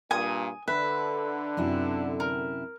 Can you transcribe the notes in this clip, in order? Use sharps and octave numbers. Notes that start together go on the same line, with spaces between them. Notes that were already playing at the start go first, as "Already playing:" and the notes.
G2 A#2 G#5 D#6
D3 B4 E5
F#2 C3 E4
A#4